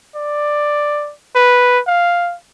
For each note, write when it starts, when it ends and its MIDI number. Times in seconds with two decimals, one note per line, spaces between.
0.16 1.13 74
1.35 1.80 71
1.87 2.35 77